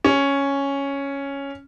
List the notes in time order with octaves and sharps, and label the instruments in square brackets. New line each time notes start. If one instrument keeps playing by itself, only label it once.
[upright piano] C#4